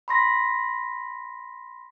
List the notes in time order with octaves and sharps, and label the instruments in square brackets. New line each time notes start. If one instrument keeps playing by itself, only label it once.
[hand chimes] B5 C6 A#6 B6